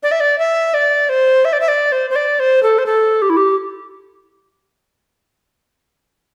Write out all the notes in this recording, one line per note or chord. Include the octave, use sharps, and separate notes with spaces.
D5
E5
D5
E5
D5
C5
E5
D5
E5
D5
C5
C5
D5
C5
A4
C5
A4
G4
E4
G4